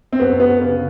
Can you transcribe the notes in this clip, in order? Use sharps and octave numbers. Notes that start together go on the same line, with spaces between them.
C4
F#2 B3
B3
C#3 B3